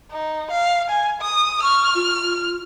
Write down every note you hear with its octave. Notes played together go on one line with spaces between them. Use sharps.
D#4
F5
G#5
D#6
C#6 F6
F4